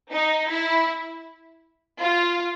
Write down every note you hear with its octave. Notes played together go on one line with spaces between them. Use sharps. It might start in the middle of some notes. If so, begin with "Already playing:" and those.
D#4
E4
F4